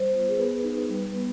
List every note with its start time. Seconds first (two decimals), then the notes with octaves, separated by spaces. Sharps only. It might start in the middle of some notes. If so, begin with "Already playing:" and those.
Already playing: G3 C5
0.11 B3 F4
0.28 G#4
0.37 B3 B4
0.64 D#4
0.89 G3
1.15 B3